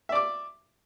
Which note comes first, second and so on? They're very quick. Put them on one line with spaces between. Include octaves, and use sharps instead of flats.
E5 D5 D6